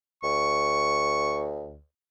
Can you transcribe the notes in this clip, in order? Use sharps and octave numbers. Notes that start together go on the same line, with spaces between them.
D2 C#6